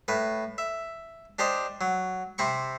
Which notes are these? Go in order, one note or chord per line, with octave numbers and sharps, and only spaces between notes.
A2 B4
E5
D4 G4 C5 D#5
F#3
C3 C4 B5 C#6